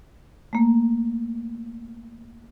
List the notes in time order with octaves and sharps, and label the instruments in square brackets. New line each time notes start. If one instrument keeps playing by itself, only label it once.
[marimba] A3 A#3